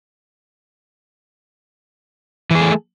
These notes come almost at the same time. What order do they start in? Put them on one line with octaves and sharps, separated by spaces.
E3 G#4 A3